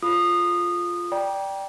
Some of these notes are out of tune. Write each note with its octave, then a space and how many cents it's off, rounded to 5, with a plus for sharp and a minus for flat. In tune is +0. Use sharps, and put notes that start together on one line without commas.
F4 +0 A4 -30 D#6 -20
D5 +0 G5 +0 A#5 +35